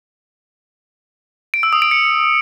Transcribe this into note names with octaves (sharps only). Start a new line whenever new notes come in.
D7
E6
D#6
D7
C#7